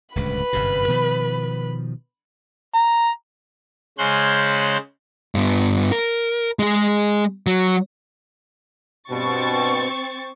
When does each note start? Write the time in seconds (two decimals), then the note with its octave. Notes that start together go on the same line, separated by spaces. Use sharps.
0.16 D1 C#2 G2 B4 B5
0.53 G1 F#2 C3
0.88 B2 D#3 F3
2.74 A#5
3.98 C#3 G#3 C#4 C5 F#6 G6
5.35 G2 B3
5.92 A#4
6.59 G#3 G#4
7.47 F#3
9.11 G2 B2 C4 C#6 A6